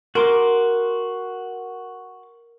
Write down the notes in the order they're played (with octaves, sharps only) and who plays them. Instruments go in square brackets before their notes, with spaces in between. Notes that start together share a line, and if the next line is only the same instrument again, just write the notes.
[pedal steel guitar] F#4 C6 D6 [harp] A#4